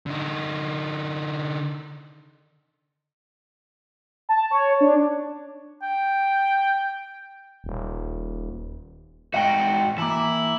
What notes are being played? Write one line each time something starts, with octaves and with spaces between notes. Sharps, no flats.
D3 D#4
A5
C#5
D4
G5
D#1
G#2 F#4 D#5 G5
E3 A#3 E4